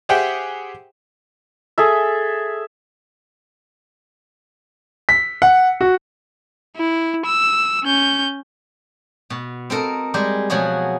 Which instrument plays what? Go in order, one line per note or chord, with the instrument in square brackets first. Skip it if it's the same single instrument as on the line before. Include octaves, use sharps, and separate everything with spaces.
[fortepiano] G4 G#4 C5 E5 F#5 G5
[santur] G#4 A4 E5
[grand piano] B6
F#5
F#4
[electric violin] E4
E6
C#4 G6
[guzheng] B2
C4 A4 A#4 D#5
G3 G#3 G4
B2 F3 F#3 F#4 G#4